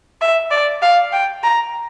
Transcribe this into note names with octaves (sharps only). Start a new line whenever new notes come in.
E5
D5
F5
G5
A#5